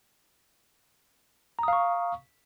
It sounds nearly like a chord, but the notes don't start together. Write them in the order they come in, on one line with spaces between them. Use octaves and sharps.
A#5 D#6 F5 C#6